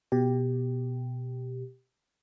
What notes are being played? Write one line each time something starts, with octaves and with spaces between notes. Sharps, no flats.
B2 G4